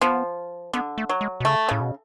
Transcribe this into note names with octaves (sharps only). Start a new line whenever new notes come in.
F3 B3
D3 B3
A3
F#3
G#3
B2
C#3 A3
A2 C#3
B2